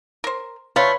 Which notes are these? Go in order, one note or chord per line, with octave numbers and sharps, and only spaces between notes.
A#4 C5
A3 F4 B4 C#5 A#5